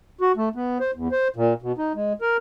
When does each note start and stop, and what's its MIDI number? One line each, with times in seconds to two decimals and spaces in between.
0.21 0.32 66
0.37 0.49 57
0.55 0.78 59
0.80 0.91 72
0.95 1.08 40
1.12 1.28 72
1.36 1.53 46
1.62 1.72 47
1.78 1.93 63
1.95 2.13 56
2.21 2.37 70